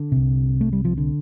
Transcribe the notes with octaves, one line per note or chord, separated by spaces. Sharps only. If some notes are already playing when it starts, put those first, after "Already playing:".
Already playing: D3
C2 C3
A3
G3
F3
D3